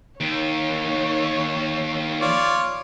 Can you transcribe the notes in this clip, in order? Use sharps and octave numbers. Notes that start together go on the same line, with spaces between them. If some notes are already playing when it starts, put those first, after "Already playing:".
D#2 D#3 C#5
F4 C#5 D5